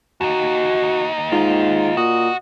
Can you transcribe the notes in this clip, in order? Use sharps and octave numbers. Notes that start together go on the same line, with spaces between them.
D#2 D#4 F#4
G#2 F4
A#2 F#4 D#5